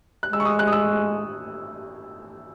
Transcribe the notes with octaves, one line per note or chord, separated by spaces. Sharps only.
F#6
G#3 E6
C#6
D#6
F#6
D#6
E6